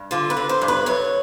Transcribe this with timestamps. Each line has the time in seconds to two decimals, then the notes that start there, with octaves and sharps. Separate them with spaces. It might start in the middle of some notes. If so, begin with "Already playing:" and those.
Already playing: G2
0.11 D3 F4
0.30 B4
0.37 D3
0.49 C5
0.62 G2
0.68 B4
0.86 F#2 C#5